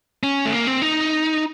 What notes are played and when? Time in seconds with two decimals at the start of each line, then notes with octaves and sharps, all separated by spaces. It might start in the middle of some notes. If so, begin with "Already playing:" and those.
0.23 C#4
0.46 A3
0.52 A#3
0.67 C4
0.82 D#4